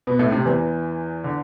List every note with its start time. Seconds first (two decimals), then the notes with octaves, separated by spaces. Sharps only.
0.07 B2 B3
0.19 A2 A3
0.32 C3 C4
0.46 E2 E3
1.24 D3